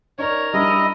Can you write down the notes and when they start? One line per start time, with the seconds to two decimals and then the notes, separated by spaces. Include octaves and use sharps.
0.19 D#4 A#4 C#5 D5
0.54 G3 D4 E4 D#5